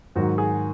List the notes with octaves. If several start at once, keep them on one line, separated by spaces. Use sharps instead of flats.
G#2 D#3 F#3 F#4
G#4